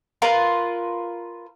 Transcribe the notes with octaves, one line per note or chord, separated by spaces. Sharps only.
F4 A#4 B4